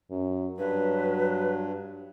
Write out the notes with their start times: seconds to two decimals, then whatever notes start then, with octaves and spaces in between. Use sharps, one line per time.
0.10 F#2
0.58 G2 F#3 B4